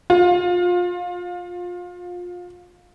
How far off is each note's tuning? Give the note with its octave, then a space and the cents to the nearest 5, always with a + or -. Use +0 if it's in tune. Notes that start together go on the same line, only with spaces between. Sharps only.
F4 +25